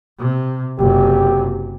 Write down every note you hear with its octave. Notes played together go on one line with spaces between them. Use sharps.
C3
F#1 C3 G4